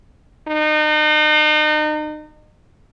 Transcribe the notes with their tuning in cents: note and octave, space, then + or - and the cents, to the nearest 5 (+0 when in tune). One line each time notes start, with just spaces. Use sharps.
D#4 -35